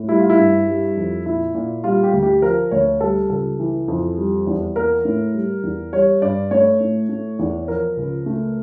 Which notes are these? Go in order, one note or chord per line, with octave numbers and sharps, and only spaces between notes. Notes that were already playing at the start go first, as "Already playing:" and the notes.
Already playing: A2
G3 E4
F4
E4
G2
G3
F2
A#2 E4
A#2
G3 F4
G4
D2
G4
F3 A#4
D2 C#5
G3 A4
C#2 A4
E3
F2
G3
E2
A#3 A#4
A2
G3
E2
G3 C#5
G2 D5
A3 C#5
A2
A3
E2
F3 A#4
C#2
A3